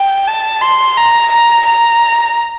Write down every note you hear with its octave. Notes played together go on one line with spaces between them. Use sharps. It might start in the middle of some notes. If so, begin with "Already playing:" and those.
Already playing: G5
A5
C6
A#5
A#5
A#5